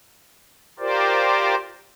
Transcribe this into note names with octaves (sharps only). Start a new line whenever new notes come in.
F4 G4 A#4 C5 D5